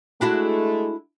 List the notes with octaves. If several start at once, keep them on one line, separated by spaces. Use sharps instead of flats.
G#3 A3 D4 E4 F#4